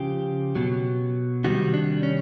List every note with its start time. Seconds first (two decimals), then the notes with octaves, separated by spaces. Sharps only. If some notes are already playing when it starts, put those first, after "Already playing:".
Already playing: C#3 F3 G4
0.55 B2 F#3
1.44 C3 D#3 G3 F#4
1.74 D4
2.03 C#4